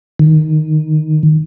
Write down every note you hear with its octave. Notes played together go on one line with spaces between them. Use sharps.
D#3